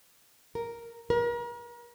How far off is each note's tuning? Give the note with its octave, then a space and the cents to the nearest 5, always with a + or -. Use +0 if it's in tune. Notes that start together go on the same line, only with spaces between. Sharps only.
A#4 +0
A#4 +40